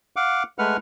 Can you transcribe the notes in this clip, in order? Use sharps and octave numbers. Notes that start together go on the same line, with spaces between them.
F5 F#5 D6
G#3 A3 B4 F#5 F6